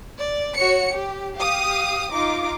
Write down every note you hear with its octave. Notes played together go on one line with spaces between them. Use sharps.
D5
F#4 C#5 C#7
G4
G4 F5 D#6
D#4 F4 D6